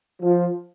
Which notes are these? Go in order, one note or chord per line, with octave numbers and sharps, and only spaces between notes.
F3